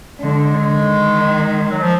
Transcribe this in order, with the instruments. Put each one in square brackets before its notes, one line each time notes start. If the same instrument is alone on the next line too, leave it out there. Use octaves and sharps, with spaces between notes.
[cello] D3 [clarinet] G#3
[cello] D#3
[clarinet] F#3
F3